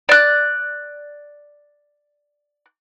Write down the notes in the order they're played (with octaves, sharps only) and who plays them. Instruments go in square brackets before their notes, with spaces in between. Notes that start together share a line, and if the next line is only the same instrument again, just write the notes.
[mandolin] D5 F#6